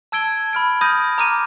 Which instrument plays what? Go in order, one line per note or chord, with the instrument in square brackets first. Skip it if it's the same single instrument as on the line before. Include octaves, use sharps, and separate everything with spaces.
[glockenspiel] A5 E6 G#6 D7 G7
B5 F6 D7
B5 D#6 F6 G6 A#6 D#7
A#5 D6 F6 D#7